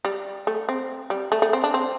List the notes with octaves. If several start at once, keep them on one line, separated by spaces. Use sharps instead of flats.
G3
A3
C4
G3
A3
A3
C4
D4
C4